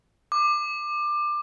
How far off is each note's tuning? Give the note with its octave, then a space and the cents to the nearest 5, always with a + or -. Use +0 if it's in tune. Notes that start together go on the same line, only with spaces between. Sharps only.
D6 +20